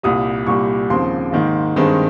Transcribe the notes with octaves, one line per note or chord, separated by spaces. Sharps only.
C2 A#2 G3 D#6
C2 A#2 G3 C#6
D#2 C#3 F3 C4 C6
G#2 D#3 A#3
G2 D#3 G#3 C4